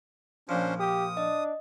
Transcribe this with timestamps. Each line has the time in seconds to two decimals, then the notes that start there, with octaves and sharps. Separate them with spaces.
0.49 A#1 F3 C#4 D4 C5
0.80 G4 D#6
1.17 D4 D#5